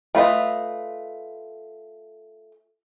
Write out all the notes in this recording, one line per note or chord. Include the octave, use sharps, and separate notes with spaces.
A3 F4 B4 D#5